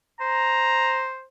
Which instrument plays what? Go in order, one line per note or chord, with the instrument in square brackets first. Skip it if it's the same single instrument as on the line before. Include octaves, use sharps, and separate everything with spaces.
[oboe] C5 [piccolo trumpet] A#5